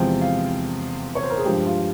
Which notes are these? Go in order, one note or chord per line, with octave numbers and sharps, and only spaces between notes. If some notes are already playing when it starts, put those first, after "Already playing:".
Already playing: E2 C3 F3 G#3 G5
F5
C#5
C5
A#4
G#4
G2 F3 G#3 G4
F4